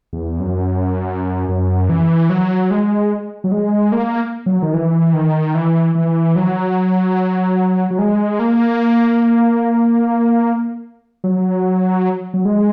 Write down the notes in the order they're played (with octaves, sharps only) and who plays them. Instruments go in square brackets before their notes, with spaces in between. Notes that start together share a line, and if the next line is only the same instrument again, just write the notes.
[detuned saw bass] E2
F#2
F#2
E3
F#3
G#3
F#3
G#3
A#3
F#3
D#3
E3
D#3
E3
E3
F#3
F#3
G#3
A#3
F#3
F#3
G#3